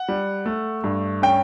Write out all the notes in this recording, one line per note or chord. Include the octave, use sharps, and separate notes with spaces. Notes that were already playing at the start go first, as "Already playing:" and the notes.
Already playing: F#5
G3
A3
G2
C#4 G5